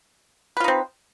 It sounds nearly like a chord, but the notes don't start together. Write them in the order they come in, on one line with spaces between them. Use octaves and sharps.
B4 F4 D#4 C4